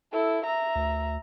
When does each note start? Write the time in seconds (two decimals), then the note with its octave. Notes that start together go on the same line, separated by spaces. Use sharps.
0.12 E4 A4
0.44 E5 A#5
0.76 D2